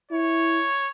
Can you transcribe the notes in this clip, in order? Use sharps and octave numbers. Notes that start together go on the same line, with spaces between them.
E4 C#5